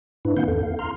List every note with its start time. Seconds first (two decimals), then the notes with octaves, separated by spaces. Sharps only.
0.25 G#2 D4 E4 B4
0.37 D#3 A#3 C4 F5 F#5 G6
0.48 E2 A4
0.63 F5
0.79 A#5 C6 F6